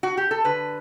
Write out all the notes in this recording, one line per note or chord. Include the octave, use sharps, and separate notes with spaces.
F#4
G4
A4
D3 B4